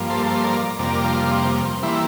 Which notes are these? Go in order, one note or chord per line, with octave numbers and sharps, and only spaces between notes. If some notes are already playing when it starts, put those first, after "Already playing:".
Already playing: G2 F3 A#3
A4 C5
A4 C5
A#4 D5
F2 C3 G3 A#3 A#4 D5
D4 F4
C4
C4
E3 G3 A#3 C4 E4